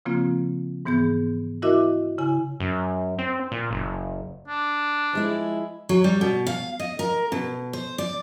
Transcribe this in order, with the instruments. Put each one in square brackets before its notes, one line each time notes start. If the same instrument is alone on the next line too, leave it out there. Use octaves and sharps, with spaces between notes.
[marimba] C#3 F3 A#3 C4 F4
G#2 E3 B3 G#4 G6
E4 F#4 A#4 D#5 E5 D6
C#3 E4 G#5
[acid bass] F#2
C4
A#2
F#1
[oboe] D4
[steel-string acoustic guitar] F3 G#3 E4
F#3
G3
B2
F5
D#5
A#4
B2
C5
D5